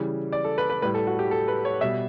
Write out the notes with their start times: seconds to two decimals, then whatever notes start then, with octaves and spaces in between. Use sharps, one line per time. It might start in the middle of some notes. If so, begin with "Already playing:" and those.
Already playing: C#3 E3 G3
0.32 D5
0.45 A4
0.58 B4
0.70 B4
0.82 A2 G3 B4
0.95 A4
1.07 F#4
1.19 G4
1.31 A4
1.48 B4
1.65 C#5
1.81 B2 G3 E5